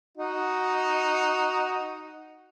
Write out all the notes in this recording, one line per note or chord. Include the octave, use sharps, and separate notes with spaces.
D#4 F#4